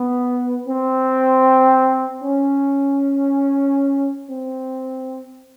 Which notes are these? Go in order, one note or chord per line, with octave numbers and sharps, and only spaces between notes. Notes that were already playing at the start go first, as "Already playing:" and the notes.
Already playing: B3
C4
C#4
C4